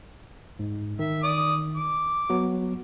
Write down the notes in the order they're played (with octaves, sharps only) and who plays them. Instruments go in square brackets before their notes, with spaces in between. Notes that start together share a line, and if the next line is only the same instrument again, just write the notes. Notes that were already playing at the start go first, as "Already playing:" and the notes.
[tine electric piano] G#2
[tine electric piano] D#3 [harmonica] E5
[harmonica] D5 D#6
D6
[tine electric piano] F#3 B3 F#4